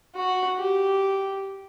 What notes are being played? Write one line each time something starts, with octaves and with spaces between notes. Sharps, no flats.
F#4
G4